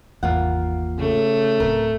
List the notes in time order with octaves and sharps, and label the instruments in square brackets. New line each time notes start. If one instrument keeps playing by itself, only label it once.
[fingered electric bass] G#1 E2 [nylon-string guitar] A#3 F4 F#5
[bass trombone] C#3 [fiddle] A3
[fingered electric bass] D1 C4 [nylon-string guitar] A#4